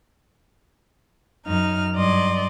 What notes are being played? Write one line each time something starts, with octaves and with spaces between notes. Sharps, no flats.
F#2 D#4 F6
G2 F#3 D5 D#5 C6